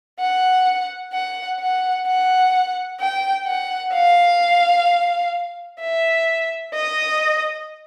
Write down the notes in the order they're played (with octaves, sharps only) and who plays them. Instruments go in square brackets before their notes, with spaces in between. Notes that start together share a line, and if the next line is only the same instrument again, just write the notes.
[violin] F#5
F#5
F#5
F#5
G5
F#5
F5
E5
D#5